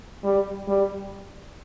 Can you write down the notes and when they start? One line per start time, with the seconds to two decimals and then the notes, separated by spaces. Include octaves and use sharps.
0.24 G3
0.68 G3